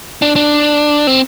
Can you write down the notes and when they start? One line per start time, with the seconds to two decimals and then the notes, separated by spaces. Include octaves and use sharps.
0.22 D4
0.36 D4
1.07 C4